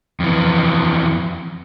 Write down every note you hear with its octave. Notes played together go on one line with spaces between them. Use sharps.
F2 E3